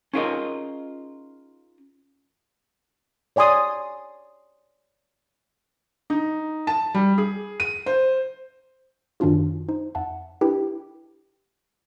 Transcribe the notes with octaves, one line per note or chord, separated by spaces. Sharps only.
C#4 D#4 F4 G#4 A#4 D#5
C#5 D5 G#5 C6 D#6
D#4
A5
G3
G#4
D#7
C5
F#2 D#3 C#4 D4 F4 F#4
D#4 C5
F2 E5 F#5 A5
D4 E4 G4 B4 G5